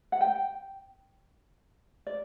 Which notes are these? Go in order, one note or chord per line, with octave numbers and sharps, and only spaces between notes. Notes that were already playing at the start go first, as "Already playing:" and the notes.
F#5
G5
D5